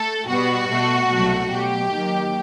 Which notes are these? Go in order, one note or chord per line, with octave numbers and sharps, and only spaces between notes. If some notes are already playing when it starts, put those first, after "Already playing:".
Already playing: A3 A4
B2 G3 B3 F#4
B2 A3
C2 B2 F#3 A3
B2 F#3 A3 G4
D#2 D#3 F#3